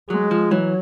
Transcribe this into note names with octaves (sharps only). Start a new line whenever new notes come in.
F#3 G#3
F3
E3 F#3